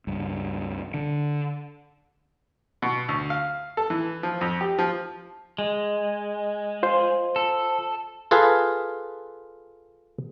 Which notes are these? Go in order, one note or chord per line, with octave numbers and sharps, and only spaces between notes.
C#2 G2
D3
B2
D2
F5
A4
E3
F3
F2
G4
F3
G#3
F4 C5
A4
F4 G#4 A4 B4 F5